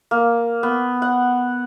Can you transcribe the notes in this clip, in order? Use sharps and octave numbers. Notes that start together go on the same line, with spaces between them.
A#3
B3
F#5